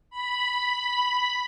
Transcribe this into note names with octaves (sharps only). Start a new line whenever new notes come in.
B5